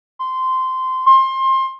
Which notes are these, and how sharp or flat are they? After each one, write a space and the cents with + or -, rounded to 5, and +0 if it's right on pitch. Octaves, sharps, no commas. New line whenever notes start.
C6 -15
C6 +25